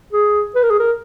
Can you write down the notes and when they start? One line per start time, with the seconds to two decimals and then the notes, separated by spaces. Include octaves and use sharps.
0.13 G#4
0.55 B4
0.63 A#4
0.70 G#4
0.79 A#4